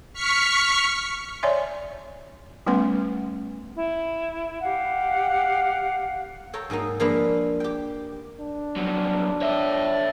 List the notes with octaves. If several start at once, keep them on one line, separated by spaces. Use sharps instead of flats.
C#6 F6 B6 C#7
C#5 D5 E5 G#5 C6
G3 A3 B3 C#4 B4 C6
E4
G4 F5 F#5
A4 C#5 G5 A#5
G#2 F#3 A#3 D#4
F3 G#3 A#3 D4 E4 B4
G4 G5
D4
C2 F#3
C#5 E5